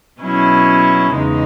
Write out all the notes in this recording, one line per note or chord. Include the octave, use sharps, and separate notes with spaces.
B2 F#3 C#4 E4
E2 C#3 G#3 D#4